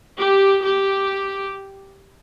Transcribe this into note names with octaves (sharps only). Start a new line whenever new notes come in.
G4
G4